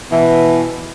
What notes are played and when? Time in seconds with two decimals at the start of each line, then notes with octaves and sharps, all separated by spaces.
0.12 B2 E3